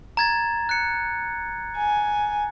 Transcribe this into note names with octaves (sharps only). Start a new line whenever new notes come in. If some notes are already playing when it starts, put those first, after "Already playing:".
A#5 G#6 A6
F#6 C#7
G#5